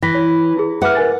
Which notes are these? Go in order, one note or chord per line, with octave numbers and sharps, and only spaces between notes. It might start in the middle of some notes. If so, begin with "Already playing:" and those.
E3 A#6 B6
C#5
E4 G#4
B4 E5 F#5 D6 F6
A#4 G#5 A6